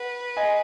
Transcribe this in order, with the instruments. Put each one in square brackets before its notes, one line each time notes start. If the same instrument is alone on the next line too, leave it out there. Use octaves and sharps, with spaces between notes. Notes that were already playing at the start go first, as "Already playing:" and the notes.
Already playing: [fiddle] B4 [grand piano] F#5
[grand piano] D#5 G#5